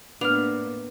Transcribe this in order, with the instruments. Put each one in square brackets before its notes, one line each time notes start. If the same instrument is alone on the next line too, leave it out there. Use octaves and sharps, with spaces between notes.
[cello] A2 A#3 [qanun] B3 [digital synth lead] D4 [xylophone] F6 F7